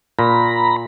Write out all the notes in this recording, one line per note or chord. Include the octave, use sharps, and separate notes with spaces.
A#2 A#5 B5